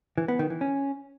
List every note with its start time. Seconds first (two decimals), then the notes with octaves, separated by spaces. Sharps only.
0.18 E3
0.28 B3
0.39 D#3
0.50 E3
0.61 C#4